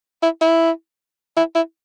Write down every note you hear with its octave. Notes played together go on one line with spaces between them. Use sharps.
E4
E4
E4
E4